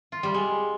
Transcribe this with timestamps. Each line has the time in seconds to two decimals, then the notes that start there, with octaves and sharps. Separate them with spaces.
0.12 F4
0.23 G3
0.34 G#3